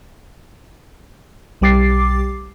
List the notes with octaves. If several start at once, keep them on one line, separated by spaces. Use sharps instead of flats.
B1 G3 G4 D6 A6 C7